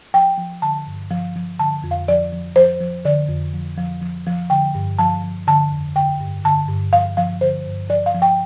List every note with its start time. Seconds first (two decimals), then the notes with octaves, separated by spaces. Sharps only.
0.14 F3 G5
0.38 F3
0.62 D3 A5
0.87 G2
1.11 F3
1.36 F3
1.59 D3 A5
1.84 F2
1.91 F5
2.08 F3 D5
2.32 F3
2.56 F3 C5
2.81 F3
3.05 D3 D5
3.29 F2
3.54 F3
3.78 F3
4.01 F3
4.26 F3
4.50 D3 G5
4.75 G2
4.99 F3 A5
5.24 F3
5.47 D3 A5
5.71 F2
5.96 D3 G5
6.20 G2
6.45 D3 A5
6.69 G2
6.93 F3 F5
7.17 F3 F5
7.41 D3 C5
7.66 G2
7.90 F3 D5
8.06 F5
8.14 F3
8.22 G5